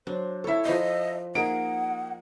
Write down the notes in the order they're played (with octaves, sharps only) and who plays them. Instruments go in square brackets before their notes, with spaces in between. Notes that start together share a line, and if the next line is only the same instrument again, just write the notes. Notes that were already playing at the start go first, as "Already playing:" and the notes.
[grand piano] F#3 [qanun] D4 [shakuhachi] C5
[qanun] E4 C#5 [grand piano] A4 E5
[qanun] F3 B5 C6 [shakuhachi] D#5
[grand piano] A#3 D#4 D7 [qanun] G#4 A#4 [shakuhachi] F#5